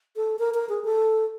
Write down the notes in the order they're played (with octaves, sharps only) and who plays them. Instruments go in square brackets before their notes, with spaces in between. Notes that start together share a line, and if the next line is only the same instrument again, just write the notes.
[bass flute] A4
A#4
A#4
G#4
A4